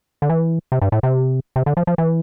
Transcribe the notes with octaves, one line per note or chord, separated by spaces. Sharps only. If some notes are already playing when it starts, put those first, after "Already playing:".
D3
E3
C3
G2
A2
C3
C3
D3
F3
F3
E3